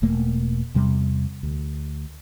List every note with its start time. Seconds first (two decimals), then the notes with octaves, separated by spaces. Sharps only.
0.02 E1 B2 A3 A#3
0.74 E2 C3 G3
1.43 D2